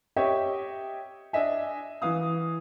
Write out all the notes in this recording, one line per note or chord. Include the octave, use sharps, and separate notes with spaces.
G4 C#5 D#5 E5 G5
D4 D#5 E5 G#5
E3 F5 D#6